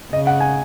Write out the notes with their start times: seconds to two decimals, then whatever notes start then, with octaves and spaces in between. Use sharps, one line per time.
0.13 C#3 D#5
0.27 F#5
0.40 G#5